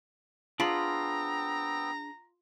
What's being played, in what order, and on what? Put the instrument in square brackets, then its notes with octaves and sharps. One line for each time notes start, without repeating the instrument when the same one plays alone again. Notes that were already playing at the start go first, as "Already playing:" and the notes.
[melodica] B3 C4 G5 [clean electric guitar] D4 G#4 B5 [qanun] F4 [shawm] A#5